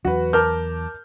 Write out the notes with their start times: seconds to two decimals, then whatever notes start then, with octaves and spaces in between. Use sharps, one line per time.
0.05 E2 F#3 F#4 B4
0.33 A#4 A5 D6 F6 G6